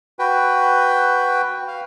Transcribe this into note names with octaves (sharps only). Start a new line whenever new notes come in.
F#4 B4 G5
F5